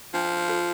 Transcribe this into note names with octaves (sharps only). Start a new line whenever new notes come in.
F3 D4
F4 A4